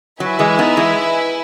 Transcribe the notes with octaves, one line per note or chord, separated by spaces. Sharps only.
F#3 E4 B4 E5 G#5
E3 G#3
B3 D#4
E3 G#3